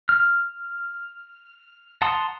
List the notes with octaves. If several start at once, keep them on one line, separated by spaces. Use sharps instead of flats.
F6
F#5 A5 A#5 C6 D#6